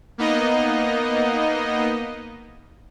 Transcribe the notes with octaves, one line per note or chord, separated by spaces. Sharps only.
A#3 B3 D#4 D#5